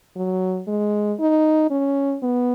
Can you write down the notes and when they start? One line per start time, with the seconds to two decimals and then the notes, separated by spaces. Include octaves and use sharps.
0.16 F#3
0.68 G#3
1.20 D#4
1.71 C#4
2.23 B3